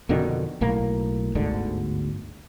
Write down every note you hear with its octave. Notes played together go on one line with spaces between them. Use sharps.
F2 B2 D3 D#3
B1 A2 A#3
G1 D2 G#2 D3